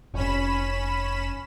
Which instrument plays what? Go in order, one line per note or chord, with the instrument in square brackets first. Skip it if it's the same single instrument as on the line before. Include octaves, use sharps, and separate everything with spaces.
[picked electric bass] F1 [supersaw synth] C#4 B5 E7